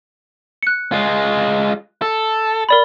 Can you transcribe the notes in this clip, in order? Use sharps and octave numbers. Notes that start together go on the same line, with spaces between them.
F#6 C#7
G#3 F4
A4
A#4 D5 B5